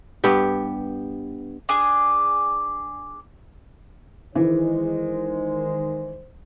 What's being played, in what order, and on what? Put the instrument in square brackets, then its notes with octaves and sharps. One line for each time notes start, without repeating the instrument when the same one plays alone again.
[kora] G2 B3 G4
[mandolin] D4 G#4
[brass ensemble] D#3 G#3 C5 [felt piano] E3